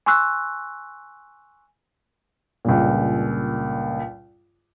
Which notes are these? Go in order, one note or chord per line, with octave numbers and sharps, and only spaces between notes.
G#5 C6 C#6 E6 F#6
C#2 G2 A#2